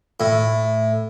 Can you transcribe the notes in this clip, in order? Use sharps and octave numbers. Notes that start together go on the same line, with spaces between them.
A2